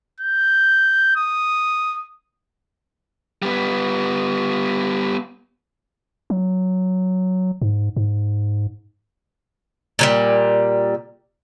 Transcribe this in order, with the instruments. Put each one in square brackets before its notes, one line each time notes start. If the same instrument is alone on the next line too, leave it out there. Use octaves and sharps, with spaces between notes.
[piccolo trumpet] G6
D#6
[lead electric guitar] G3 B3
[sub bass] F#3
G#2
G#2
[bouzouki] A#2 F#3 G3